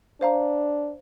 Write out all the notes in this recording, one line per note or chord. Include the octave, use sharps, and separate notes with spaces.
D4 C5 F5 A#5